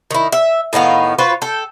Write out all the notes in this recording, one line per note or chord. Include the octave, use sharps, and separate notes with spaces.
D#3 E4
E5
A2 D#3 B3 F5
F4 F#4 B4 C5
A4 G5